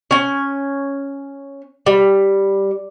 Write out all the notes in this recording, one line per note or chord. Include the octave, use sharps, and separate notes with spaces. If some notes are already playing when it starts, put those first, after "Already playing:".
C#4 G#5
G3